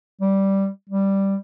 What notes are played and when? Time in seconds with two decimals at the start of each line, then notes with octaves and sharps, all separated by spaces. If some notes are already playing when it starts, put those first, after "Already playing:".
0.21 G3
0.89 G3